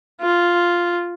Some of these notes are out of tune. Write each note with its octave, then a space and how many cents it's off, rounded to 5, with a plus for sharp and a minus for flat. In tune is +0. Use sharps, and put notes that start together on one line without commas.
F4 +0